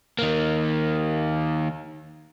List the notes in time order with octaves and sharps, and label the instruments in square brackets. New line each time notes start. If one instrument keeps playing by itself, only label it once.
[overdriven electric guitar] D#3 A#3